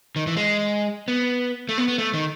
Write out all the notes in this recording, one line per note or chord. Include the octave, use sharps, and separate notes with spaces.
D#3
E3
G#3
B3
A3
B3
B3
A3
D#3